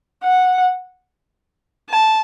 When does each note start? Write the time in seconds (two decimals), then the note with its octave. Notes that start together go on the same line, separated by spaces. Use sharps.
0.24 F#5
1.90 A5